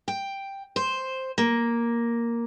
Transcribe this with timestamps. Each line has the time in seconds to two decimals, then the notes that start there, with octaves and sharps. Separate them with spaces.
0.08 G5
0.76 C5
1.38 A#3